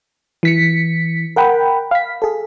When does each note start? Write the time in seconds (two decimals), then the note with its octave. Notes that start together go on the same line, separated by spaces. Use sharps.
0.43 E3 B6 C#7
1.36 A#4 F#5 G5 B5
1.91 F5 B6
2.22 G#4 A4